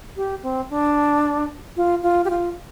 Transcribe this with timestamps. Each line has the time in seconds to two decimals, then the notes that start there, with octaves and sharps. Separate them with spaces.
0.17 G4
0.43 C4
0.70 D4
1.77 F4
2.03 F4
2.25 G4
2.30 F4